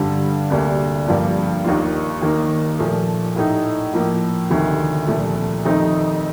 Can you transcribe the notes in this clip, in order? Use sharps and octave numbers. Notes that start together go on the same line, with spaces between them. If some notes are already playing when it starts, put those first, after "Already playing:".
Already playing: G2 D3 G3 D4
D2 C3 G3 A#3 D4
G2 F3 A#3 D4
D#2 D#3 A#3 F4
D#2 D#3 A#3
A#2 F3 A3
A2 A3 D#4
A2 F3 A#3
D2 C3 D#3
C2 A#2 F3 A3
F2 D#3 A3 C4 D#4